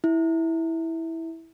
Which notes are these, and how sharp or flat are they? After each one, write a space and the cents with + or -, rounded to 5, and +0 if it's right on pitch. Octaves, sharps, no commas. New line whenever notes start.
E4 -10